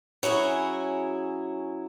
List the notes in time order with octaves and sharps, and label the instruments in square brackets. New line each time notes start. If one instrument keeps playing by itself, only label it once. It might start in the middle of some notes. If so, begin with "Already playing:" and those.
[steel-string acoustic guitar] F#3 C#4 E4 G#4